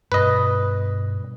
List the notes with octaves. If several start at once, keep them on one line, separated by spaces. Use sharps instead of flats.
G2 B2 B4 D#5